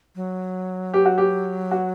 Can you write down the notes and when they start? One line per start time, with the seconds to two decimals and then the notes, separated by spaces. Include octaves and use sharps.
0.16 F#3
0.94 G4
1.06 F#4
1.18 G4
1.71 F#4